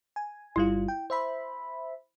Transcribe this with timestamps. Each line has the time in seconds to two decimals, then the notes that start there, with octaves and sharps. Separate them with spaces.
0.16 G#5
0.56 G1 G3 E4 F4
0.88 G5
1.10 C5 E5 B5